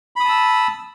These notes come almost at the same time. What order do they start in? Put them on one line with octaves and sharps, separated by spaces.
B5 D#6 A5 E6